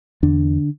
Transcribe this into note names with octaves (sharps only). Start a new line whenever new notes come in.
E2 D3 D4